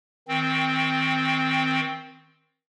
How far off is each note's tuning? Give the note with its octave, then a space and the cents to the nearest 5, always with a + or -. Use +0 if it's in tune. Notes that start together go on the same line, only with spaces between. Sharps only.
D#3 +30 C4 +0